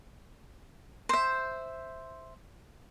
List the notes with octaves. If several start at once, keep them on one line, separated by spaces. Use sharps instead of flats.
C5 E5